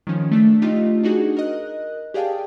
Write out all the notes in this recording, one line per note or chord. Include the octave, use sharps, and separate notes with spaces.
D#3 F3 C#4
A3 D4 B6
A3 D4 D#4 F4 G4 D#5
D4 D#4 F#4 G#4
A#4 D#5 F#6
G4 G#4 D5 F5 G5 A5